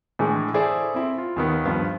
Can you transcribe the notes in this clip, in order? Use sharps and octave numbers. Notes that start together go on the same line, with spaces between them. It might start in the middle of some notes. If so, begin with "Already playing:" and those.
A2 D3 E3 G#3
E4 G#4 A4 C5 D5
C4 E4
F4
D#2 D#3 B3
G2 F3 B3